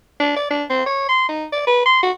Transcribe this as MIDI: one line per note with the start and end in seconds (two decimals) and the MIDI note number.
0.20 0.32 62
0.36 0.48 74
0.50 0.64 62
0.69 0.86 60
0.86 1.07 73
1.09 1.26 84
1.29 1.45 63
1.52 1.66 74
1.67 1.85 71
1.86 2.01 84
2.03 2.11 66